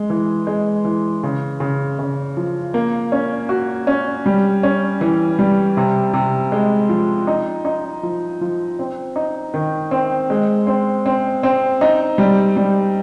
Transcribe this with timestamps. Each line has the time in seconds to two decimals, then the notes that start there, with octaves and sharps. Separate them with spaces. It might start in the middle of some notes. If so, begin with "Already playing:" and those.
Already playing: G#3
0.10 E3
0.47 G#3
0.85 E3
1.23 C#3
1.60 C#3
1.99 C#3
2.37 F3
2.74 A#3
3.12 C#4
3.49 F#4
3.87 C#4
4.26 G3
4.63 C#4
5.01 E3
5.39 G3
5.77 C3
6.13 C3
6.52 G#3
6.89 F3
7.27 D#4
7.65 D#4
8.03 F3
8.41 F3
8.79 C4
9.16 D#4
9.54 D#3
9.91 C4
10.30 G#3
10.67 C4
11.06 C4
11.43 C4
11.81 D#4
12.18 G3
12.56 G3